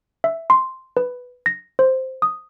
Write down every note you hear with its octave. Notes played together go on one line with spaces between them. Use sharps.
E5
C6
B4
A#6
C5
D#6